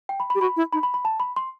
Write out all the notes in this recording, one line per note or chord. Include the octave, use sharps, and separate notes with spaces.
G5
B5
B5
G4
F#4 B5
E4
D#4 B5
B5
B5
A5
B5
C6